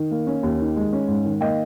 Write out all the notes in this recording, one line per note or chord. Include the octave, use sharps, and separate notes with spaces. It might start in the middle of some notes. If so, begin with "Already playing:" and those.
Already playing: D#3
A#3
C#4
D#2
D#3
G#3
C#4
G#2
D#3
A#3 D#5 G5